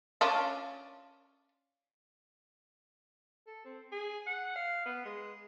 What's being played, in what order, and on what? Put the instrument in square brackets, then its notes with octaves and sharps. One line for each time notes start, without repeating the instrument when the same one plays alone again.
[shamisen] C#4 D4 F4
[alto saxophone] A4
C4
G#4
F#5
F5
B3
G#3